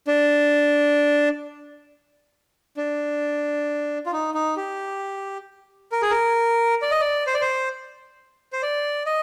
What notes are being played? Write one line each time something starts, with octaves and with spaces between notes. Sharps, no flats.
D4
D4
F4
D#4
D#4
G4
A#4
G#4
A#4
D5
D#5
D5
C5
D5
C5
C5
D5
D#5